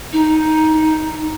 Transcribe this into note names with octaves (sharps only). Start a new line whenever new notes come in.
D#4